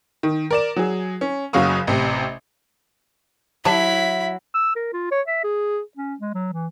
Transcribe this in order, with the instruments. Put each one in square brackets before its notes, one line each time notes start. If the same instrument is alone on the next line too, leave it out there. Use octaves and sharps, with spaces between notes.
[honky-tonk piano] D#3
A#4 D5 E7
F#3 G#4
C#4
F#1 C#3 F#3 F5 C#6 D#6
A1 C3
[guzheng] F#3 [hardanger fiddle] E4 B5 [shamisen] G4 A5 [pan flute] E5
[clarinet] E6
A#4
F4
C#5
E5
G#4
C#4
G#3
F#3
E3